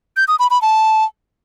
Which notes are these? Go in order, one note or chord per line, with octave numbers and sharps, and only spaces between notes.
G6
D#6
B5
B5
A5